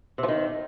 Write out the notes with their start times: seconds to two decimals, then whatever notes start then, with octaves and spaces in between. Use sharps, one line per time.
0.18 C3
0.23 F3
0.28 D#3